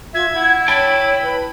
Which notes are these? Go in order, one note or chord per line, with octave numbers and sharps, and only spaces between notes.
F4 E5 G#6
E4 F#5
C#5 G5 A5 B5
B4